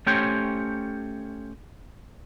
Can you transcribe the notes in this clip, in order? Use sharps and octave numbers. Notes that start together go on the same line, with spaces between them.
A3 C#4 G4 C5 C#5 G5